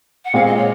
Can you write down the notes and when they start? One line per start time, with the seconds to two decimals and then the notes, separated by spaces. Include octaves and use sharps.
0.25 F#5
0.33 A#2 G#3 C4 F4 F5
0.45 D#5
0.56 C#5